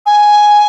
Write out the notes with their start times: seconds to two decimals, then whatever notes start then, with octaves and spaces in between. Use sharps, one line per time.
0.06 G#5